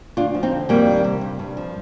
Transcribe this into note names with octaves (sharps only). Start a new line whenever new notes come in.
D2 D4 F4
F3
C4 D#4
D3
F2 G3 A#3
D#3
C3
G2
G2
F3